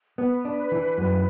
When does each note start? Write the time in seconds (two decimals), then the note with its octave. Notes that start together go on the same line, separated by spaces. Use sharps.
0.18 B3 B4
0.45 D4
0.72 E3
0.98 F#2